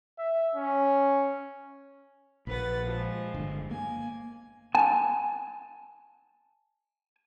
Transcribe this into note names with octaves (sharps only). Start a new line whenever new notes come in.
E5
C#4
A#1 B4 F#5 A6
F3 G#3
G1
A#3 G#5
G#5 A5